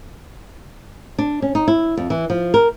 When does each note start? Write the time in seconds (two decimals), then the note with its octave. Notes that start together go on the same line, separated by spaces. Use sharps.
1.19 D4
1.42 C#4
1.55 D#4
1.68 E4
1.97 F2
2.10 E3
2.30 F3
2.54 A#4